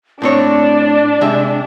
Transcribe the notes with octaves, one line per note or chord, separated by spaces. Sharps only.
A2 C4 D4 C#5 D5
C3 G#3 E5